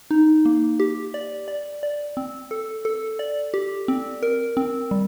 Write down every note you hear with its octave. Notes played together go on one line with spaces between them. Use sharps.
D#4
A#3
G4
D5
D5
D5
C4
A4
A4
D5
G4
C4
A#4
C4
G3